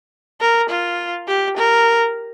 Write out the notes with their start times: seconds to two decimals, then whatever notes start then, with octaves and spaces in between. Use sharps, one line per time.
0.41 A#4
0.70 F4
1.28 G4
1.57 A#4